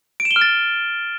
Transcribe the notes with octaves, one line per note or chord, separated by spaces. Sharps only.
D7
E7
G7
F6
A6